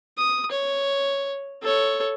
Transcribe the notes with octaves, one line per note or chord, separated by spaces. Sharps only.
D#6
C#5
A4 C#5